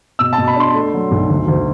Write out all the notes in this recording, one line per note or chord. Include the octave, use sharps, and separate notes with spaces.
B2 E6
A5
B2
B5
D4 C6
A3
F#3
B1
D2
D2